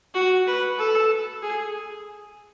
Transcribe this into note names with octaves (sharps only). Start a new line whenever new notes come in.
F#4
B4
A4
G#4